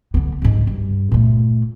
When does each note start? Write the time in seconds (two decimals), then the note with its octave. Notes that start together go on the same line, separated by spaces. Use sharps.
0.14 D3 B3
0.42 D2 G#2
0.67 G2
1.12 A#2 A3